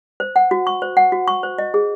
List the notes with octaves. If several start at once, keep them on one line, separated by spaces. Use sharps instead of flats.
C5
F#5
F#4
C#6
C5
F#5
F#4
C#6
C5
D#5
G#4